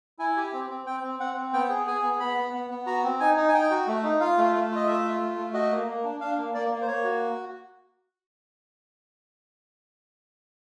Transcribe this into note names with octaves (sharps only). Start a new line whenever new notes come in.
E4 G#5
G4
C4
C4
C4 G5
C4
C4 F#5
C4
B3 G5
G#4
G#4 G#5
B3
B3 B5
B3
B3
B3
F#4 A#5
C4
D#4 G#5
D#4
G#5
D#4 G5
F#4
A3
D#4
F4 F5
A3
A3
F4 D#5
A3 E5
F4
A3
A3
F#4 D#5
A#3
A#3
D4
D4 F5
A#3
A#3 D5
A#3
C5
A#3 C#5
F#4